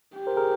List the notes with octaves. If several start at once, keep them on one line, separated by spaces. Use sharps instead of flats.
G4
A#4 C5
G#4 A#4